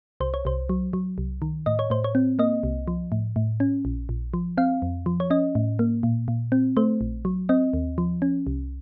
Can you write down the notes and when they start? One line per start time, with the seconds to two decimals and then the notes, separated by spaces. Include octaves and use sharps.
0.20 C2 C5
0.34 C#5
0.45 C2 C5
0.69 F#3
0.93 F#3
1.18 C2
1.42 D#3
1.66 A2 D#5
1.79 C#5
1.90 A2 C5
2.04 C#5
2.15 C4
2.39 A#3 D#5
2.63 C2
2.88 F3
3.12 A2
3.36 A2
3.60 C#4
3.85 A#1
4.09 A#1
4.34 F3
4.58 C4 F5
4.82 F2
5.06 F3
5.20 C#5
5.30 C#4 D#5
5.55 A2
5.79 A#3
6.03 A#2
6.28 A#2
6.52 C4
6.77 A3 C5
7.01 A#1
7.25 F#3
7.49 C4 D#5
7.73 D#2
7.98 F3
8.22 C#4
8.47 C2